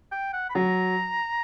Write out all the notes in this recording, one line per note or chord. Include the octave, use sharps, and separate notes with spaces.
G5
F#5
B5
F#3 A#5